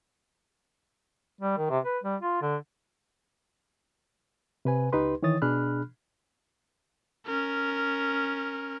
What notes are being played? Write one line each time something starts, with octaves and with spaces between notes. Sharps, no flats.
G3
D#3
C3
B4
G3
F4
D3
C3 B4 G#5
C#2 D#4 G4 B4 C6
D#3 E3 E4 C#5 D#6 A6
B2 D4 G#4 B5 F6 F#6
C#4 A#4